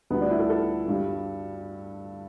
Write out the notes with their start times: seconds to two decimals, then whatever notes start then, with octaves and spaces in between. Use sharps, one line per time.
0.10 D2 D3 G3 B3
0.21 D4
0.30 E4
0.39 A4
0.50 A4
0.88 G2 G3